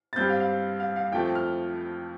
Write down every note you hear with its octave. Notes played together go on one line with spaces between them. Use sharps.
A6
G2 G3 C4 G6
F5
F5
F5
F5
F2 F3 A3 G5
F6